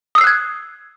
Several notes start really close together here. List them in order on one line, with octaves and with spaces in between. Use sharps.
D#6 E6 C7 F#6 G#6